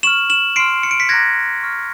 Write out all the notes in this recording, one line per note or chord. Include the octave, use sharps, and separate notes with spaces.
C#6 F6 E7 F#7
E7 F#7
C6 F6 C7 D7
C#7
D7
B6 C#7
A#5 D6 F#6 G#6 A#6
C#6 F6